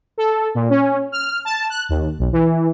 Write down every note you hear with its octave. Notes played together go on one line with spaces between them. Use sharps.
A4
A#2
C#4
F6
A5
F#6
D#2
B1
E3